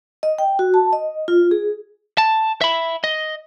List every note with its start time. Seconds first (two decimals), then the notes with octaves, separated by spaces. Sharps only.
0.23 D#5
0.39 G5
0.59 F#4
0.74 A5
0.93 D#5
1.28 F4
1.51 G#4
2.18 A5
2.61 E5 B5
3.04 D#5